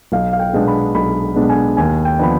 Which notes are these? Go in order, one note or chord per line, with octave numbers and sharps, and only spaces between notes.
B1 F5
F5
G5
B2 G#3 B3 D4
B5
B1 B5
B2 G#3 B3 D4
G#5
D#2 G#5
G5
D3 F3 B3 D4 B5